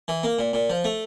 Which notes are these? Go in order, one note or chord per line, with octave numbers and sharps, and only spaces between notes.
E3
A#3
A#2
A#2
F3
A3